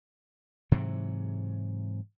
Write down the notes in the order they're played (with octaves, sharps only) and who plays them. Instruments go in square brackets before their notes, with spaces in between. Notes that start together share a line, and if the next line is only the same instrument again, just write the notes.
[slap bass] G#2 C3 E3 F#3